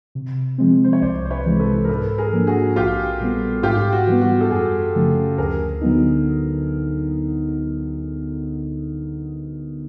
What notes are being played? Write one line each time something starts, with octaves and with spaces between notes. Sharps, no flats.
C3
F3 G#3 C4
C5
C#5
C2 C5 D5
C5
B4 C#5
C3 E3 G#3
A4 B4
A#4
G#2 A4 B4
G#4 A#4
F3 A#3 D4
F#4 G#4
A#1 F4 G4
A#2 G3 B3
G#2 F4 G4
F#4
E3 G3 B3
F#4
A4
F#2 F#4 G#4
C#3 F3 A3 C#4
D2 G#4 A#4
D3 F#3 B3 D#4